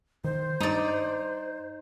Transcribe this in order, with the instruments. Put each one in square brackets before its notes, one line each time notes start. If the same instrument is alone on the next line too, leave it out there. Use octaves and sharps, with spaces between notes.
[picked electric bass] D#3 [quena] C5
[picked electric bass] G2 [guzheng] D#4 D5